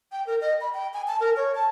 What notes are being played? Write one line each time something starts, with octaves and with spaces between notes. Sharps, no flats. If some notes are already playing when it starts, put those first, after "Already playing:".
G5
A#4
D#5
B5
G5
G#5
A5
A#4
C#5
A5